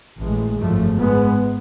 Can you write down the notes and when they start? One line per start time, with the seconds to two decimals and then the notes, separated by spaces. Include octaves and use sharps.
0.19 A1 A2 G#3
0.57 G#1 F#2 F3 A3
0.96 G#2 G#3 B3